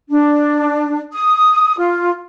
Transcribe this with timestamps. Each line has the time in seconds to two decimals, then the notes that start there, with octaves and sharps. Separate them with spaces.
0.10 D4
1.13 D#6
1.78 F4